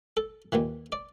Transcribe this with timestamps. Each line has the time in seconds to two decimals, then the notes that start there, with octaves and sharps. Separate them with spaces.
0.17 A4
0.52 D#2 A#2 D#3 E3
0.92 D5